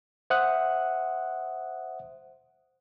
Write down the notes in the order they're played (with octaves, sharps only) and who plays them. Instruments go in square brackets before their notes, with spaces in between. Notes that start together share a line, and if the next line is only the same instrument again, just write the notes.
[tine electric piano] C5 E5 F#5 D#6 F#6